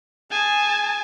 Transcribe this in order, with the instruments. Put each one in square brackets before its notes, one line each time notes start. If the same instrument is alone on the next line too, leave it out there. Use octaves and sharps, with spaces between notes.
[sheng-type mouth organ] G#4 [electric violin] G#5 A5